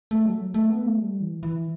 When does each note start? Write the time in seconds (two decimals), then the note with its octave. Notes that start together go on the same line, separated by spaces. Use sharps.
0.11 A3
0.26 F#3
0.54 A3
0.70 B3
0.84 A3
0.98 G3
1.20 E3
1.43 E3